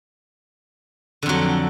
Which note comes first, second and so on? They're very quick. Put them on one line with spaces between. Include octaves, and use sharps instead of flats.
D3 F2 F#3